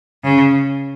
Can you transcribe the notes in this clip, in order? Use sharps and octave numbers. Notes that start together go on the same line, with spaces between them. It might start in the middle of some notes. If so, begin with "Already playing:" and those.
C#3